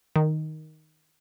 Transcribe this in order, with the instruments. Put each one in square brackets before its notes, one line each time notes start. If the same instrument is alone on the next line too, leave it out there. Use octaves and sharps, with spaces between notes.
[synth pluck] D#3